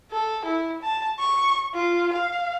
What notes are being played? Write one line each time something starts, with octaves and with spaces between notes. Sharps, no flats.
A4
E4
A5
C#6
F4
F5